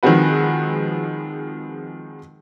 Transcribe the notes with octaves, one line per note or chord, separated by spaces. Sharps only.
D#3 F3 G#3 C4 F#4 B4